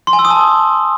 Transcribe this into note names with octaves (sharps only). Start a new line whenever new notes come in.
C6
G#5
E6
D#6
A5